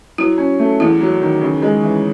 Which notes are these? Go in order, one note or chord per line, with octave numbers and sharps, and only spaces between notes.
F#3 E4
C#4
A3
E2 E4
F#3
D#3
C#3
G#3
E3